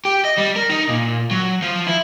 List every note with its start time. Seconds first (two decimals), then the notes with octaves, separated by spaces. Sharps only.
0.05 G4
0.25 D#5
0.38 G3
0.56 A#4
0.69 D#4
0.89 A#2
1.31 F#3
1.62 F3
1.87 E4